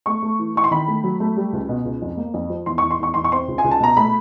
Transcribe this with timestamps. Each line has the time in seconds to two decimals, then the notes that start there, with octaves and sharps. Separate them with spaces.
0.06 A3 C#6
0.22 A3
0.39 E3
0.55 E3 C#6
0.64 C6
0.71 D#3 B5
0.88 A3
1.04 F#3
1.20 A3
1.37 G3
1.53 C#2
1.69 B2
1.85 C#2
2.02 F2
2.17 A#3
2.34 F2
2.50 F3
2.66 E2 C6
2.78 E2 C#6
2.91 C6
3.00 E2 C#6
3.14 E2 C6
3.24 C#6
3.31 C4 C6
3.48 C#2
3.58 G#5
3.64 C#2
3.71 A5
3.80 B2 A#5
3.97 A3 B5